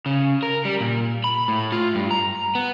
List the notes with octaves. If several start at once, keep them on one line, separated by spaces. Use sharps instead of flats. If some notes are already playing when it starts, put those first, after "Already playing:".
C#3
A#4
G3
A#2
B5
A2
F4
G2
A#5
B3